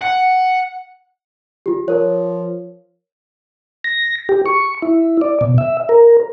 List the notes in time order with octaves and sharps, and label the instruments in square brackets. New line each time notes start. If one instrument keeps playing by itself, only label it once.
[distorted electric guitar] F#5
[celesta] F4 G4
[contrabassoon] F3 [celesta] A#4 C#5
[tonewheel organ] A#6
G4
C#6
E4
D5
B2
E5
A#4